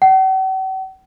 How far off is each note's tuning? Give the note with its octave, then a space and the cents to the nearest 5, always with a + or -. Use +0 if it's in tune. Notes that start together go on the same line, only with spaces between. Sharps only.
F#5 +45